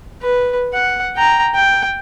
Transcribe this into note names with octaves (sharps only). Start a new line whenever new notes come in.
B4
F#5
G5 A#5
G5